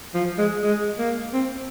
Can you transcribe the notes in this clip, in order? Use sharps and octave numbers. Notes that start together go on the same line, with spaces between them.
F3
G#3
G#3
A#3
C4